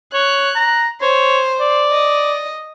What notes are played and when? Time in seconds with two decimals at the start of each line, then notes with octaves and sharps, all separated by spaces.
0.14 C#5 F#6
0.55 A#5
1.01 C5 C#5
1.60 D5
1.92 D#5